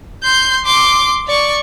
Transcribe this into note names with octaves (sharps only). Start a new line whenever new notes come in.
C6 G6
C6 D6
D5 C#6